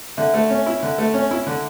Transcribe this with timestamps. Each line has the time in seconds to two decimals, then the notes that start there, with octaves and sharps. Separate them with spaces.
0.17 D3 E5
0.34 A3
0.50 C#4
0.66 E4
0.83 D3
0.98 A3
1.14 C#4
1.31 E4
1.47 D3